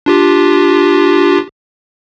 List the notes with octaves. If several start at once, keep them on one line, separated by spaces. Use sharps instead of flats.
D4 F4 G4